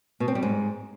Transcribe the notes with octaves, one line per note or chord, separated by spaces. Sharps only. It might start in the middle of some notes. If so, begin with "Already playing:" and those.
B2
C4
G3
G#2